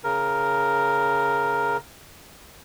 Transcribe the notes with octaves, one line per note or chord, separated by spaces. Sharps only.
C#3 A#4